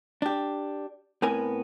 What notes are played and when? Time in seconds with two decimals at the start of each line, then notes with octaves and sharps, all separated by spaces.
0.22 D4 G4
1.22 A2 B3 C4 E4 A#4 G#5